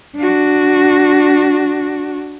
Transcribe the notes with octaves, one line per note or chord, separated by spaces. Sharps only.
D4 F#4